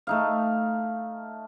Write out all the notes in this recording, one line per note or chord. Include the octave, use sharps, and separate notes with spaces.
A3 D#4 F5